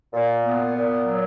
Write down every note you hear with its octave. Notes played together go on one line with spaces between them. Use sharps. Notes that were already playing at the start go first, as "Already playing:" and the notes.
A#2
B3
A#2
F#3